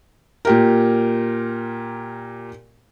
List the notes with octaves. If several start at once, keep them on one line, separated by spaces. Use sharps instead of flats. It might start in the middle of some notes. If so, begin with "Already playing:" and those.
A#2 G4 A#4